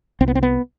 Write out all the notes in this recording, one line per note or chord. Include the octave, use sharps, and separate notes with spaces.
C2 C4
B3
C4
B3